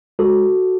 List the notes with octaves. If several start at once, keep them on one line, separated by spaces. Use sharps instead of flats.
G#3 F#4 A4